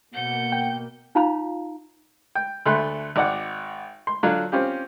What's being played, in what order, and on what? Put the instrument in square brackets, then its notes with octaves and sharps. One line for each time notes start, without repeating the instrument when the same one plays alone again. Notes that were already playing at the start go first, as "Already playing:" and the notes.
[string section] B2 A#3 [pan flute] F#5 [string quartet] G6
[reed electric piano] G5
[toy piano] D#4 F4 F5 A#5 B5
[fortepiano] G5
D2 A3 B5 C6 F#6
G#1 D5 F#5
C6
D3 F#3 D4 F4
C4 C#4 F4 G4